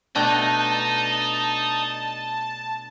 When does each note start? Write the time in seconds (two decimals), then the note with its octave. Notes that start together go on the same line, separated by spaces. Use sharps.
0.15 B2 A3 D4 D#5 G5 A#5
0.59 A5